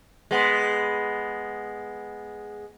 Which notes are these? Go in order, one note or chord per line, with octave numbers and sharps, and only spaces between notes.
G#3 B3